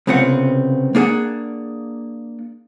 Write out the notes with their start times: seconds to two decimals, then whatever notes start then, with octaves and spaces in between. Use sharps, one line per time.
0.07 C2 C#3 B3 C4 F4 F#5
0.95 A#3 D4 G#4 F#5